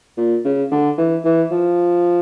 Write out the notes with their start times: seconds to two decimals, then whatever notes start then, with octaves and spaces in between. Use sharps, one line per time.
0.18 A#2
0.45 C#3
0.72 D3
0.98 E3
1.25 E3
1.52 F3